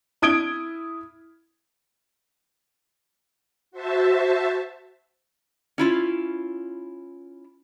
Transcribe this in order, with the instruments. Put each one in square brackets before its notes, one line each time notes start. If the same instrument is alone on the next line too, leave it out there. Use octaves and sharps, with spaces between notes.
[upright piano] E4 D#6 G#6 D7 G7
[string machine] F#4 C5 E5 A5
[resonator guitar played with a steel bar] C#4 E4 F4